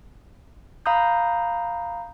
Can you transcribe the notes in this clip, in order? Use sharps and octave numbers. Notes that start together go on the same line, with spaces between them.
F5 A#5 B5 D#6 G6